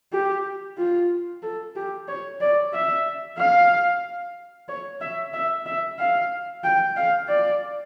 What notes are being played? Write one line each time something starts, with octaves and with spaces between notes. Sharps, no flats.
G4
F4
A4
G4
C#5
D5
E5
F5
C#5
E5
E5
E5
F5
G5
F5
D5